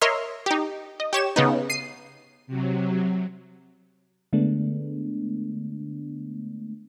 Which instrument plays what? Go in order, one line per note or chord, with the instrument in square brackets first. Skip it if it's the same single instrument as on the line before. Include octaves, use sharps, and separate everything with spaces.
[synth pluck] A#4 C#5 D#5 E5 C6 F6
D#4 G4
D#5
G4 C#5 E7
C#3 B3 D#4
C7 D#7
[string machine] C3 F#3
[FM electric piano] D3 G#3 A3 B3 D4